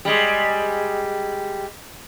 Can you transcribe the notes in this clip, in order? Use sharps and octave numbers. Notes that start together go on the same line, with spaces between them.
G3 G#3